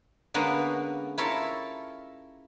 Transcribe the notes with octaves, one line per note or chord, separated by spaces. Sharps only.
D3 G#3 A#3 B3 C#4
E4 F4 A4 A#4 C#5 E5